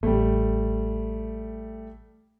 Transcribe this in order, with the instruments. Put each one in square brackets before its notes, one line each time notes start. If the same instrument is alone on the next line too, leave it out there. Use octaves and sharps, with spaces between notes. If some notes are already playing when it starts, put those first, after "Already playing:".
[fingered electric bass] A1 [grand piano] G3 A3